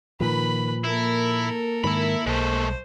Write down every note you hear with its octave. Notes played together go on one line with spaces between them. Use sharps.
A#2 D#3 F3 B4 B5
A#3 E4 A4 A#4
G#2 D#3 E4 B5
B1 G#3 A3 C5